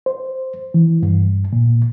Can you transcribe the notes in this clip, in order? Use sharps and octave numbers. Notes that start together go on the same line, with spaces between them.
C5
E3
G2
A#2